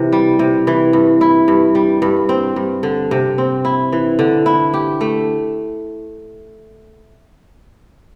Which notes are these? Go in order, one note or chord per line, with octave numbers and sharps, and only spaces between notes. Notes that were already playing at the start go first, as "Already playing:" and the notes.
Already playing: C3 E3
G3
C3
E3
G2
E4
G2
G3
G2
C4
G2
D3
C3
C4
E4
E3
D3
E4
G4
A3